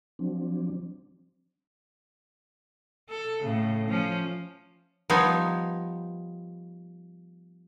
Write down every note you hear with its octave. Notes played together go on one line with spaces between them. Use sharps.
F3 F#3 C4 D4
A4
A2 C#3
F3 C#4
F3 G3 B3 D#4 C#5